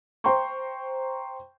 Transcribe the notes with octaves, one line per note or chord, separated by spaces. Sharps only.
C5 G5 A#5 C6 C#6